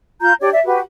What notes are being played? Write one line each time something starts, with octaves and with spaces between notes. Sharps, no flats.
F4 A#5 G6
D4 G4 C#5 D5
D5 E5
F#4 G4 B4